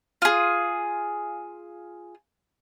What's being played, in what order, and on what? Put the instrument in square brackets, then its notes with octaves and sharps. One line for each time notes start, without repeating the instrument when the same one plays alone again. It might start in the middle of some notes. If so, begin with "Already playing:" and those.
[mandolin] F4 G#4